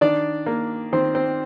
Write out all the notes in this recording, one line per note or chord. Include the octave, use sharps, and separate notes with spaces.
D#3 D4 D5
A#3
D#3 C4 C5
C4 C5